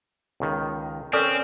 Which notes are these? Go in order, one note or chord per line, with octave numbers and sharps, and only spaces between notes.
C#2 D#3
C4 C#4 A4 A#4 D5